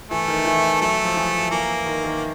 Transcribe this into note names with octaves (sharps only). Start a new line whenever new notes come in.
E3 A3
D#3
E3
F#3 A3
F3
E3
E3 A#3
D#3
D#3